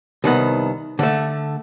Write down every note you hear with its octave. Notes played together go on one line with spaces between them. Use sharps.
C2 D#3 B3
D3 A3